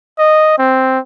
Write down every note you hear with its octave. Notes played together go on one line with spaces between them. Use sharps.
D#5
C4